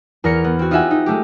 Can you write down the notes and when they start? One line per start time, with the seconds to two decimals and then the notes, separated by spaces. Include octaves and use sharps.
0.24 E2 A#4 F6 A#6 C#7
0.44 B3
0.59 C4 F#4
0.71 D#4 F4 G4 E5 F#5 G#5
0.91 D#4
1.06 G#3 A3 G4